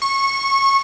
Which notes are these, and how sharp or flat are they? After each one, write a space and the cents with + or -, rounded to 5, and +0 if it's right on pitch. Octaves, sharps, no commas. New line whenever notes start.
C#6 -20